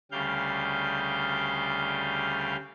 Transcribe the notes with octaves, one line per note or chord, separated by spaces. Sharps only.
D2 C#3 G3 F5 G6